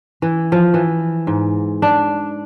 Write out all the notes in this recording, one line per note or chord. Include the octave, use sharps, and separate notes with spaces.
E3
F3
E3
G#2
D4